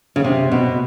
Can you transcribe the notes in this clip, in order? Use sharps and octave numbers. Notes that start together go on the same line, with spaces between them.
C#3
C3
B2